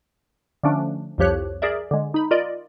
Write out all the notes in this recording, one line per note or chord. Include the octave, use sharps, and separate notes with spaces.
D3 F3 A3 C#4 D4
C2 F2 F3 G4 C#5 F#6
G#4 A#4 D5 E5
D3 G#3
D#4 B5
F4 A#4 D5 D#5